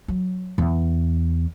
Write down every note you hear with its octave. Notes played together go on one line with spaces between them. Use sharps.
F#3
E2